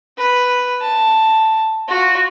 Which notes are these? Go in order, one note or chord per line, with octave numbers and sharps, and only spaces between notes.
B4
A5
F4 F#4